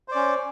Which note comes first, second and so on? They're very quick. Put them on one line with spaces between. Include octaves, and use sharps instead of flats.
C5 D5 C#4